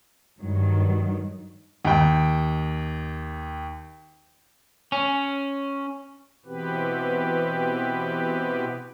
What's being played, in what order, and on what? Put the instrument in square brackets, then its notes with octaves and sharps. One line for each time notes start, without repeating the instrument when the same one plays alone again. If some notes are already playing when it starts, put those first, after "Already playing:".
[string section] G2 D#3 F#3
[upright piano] D#2 G5
[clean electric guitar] C#4
[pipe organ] B2 E3 B3 C4 G4 B4